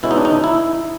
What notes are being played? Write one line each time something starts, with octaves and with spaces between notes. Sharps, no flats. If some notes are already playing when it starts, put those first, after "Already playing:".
B2 G#3 C#4 E4
D#4
D4
D#4
E4